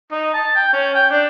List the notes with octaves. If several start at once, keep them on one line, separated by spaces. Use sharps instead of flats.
D#4
A5
G5
C#4
G5
D4